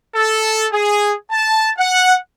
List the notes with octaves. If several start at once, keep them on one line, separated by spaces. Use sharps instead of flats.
A4
G#4
A5
F#5